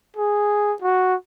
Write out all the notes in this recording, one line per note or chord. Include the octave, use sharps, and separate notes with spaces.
G#4
F#4